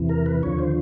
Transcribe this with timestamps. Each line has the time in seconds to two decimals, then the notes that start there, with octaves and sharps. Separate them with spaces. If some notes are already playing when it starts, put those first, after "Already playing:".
Already playing: E2 C3 E3
0.09 A#4
0.26 B4
0.43 D#2 D3 F3 C#5
0.59 C5